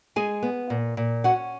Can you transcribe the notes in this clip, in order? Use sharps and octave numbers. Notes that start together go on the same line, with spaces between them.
G#3 G#4 G#5
B3
A#2
A#2
C#4 F#4 F#5